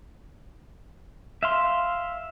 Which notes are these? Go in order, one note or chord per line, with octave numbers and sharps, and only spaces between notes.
E5 F5 C6